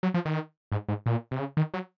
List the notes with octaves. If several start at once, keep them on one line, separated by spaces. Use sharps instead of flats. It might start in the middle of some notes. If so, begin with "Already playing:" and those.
F#3
F3
D#3
G#2
G#2
A#2
C3
C#3
D#3
F#3